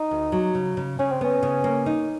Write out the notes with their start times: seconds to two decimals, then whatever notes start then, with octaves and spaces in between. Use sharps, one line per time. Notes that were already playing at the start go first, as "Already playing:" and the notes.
Already playing: D#4
0.11 D2
0.32 F#3
0.55 C#3
0.77 C#3
0.99 C#3 C#4
1.12 C4
1.21 B3 C#4
1.43 C#3
1.64 A#3
1.86 D#4